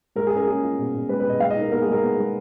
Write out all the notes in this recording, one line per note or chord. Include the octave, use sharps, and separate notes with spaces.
G#3 A#4
G#4
C#4 A#4
C#4 G#4
F4
B2
B2
G#3 B4
B4
B2 D#5
G#3 F5
D#5
D#4
A#4
B3 A#4
G#4
G#3
A#4
B3
G#3